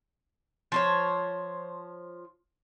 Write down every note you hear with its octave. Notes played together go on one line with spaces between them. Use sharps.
F3 C5 C#5